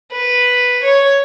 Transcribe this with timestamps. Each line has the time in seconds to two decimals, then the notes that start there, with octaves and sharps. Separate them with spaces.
0.12 B4
0.83 C#5